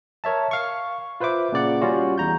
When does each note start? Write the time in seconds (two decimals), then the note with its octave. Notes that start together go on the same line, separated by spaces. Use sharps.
0.24 A#4 C#5 E5 A5
0.51 F5 C#6
1.20 F4 B4 C5 E5 D6
1.52 A#2 C#3 D5 F#5
1.81 G3 C#4 F4 F#4
2.18 E2 A#5 G6